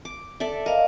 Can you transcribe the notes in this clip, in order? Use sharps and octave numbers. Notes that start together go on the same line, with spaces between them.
D6
A4 D5 E5
A#4 D#5 F5